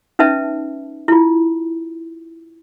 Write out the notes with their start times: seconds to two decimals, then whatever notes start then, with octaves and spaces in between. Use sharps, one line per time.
0.19 C#4 D#4 B4 E5 A5
1.08 E4 F4